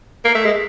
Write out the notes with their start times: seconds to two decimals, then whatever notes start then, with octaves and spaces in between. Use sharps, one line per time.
0.25 A#3
0.35 A3
0.45 G#3